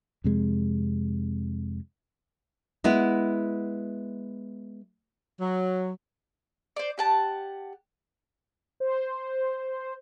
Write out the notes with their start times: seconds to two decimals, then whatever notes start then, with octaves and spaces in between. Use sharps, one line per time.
0.24 F2 C3 G#3
2.84 G#3 B3 E4
5.40 F#3
6.76 C5 D5
6.98 G4 F#5 A5
8.80 C5